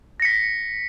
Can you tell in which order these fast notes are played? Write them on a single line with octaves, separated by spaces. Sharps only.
A#6 C#7 B6